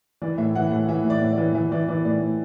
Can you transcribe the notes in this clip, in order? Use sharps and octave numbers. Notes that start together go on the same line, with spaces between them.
E3 D5
A2 E5
E3 F#5
A2 F#5
E3 E5
A2
D5
A2
D5
E3
E3 E5
E3 D5
E3 D5
A2 D5
A2